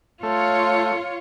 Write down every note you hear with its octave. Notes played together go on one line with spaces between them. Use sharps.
A3 F4 C#5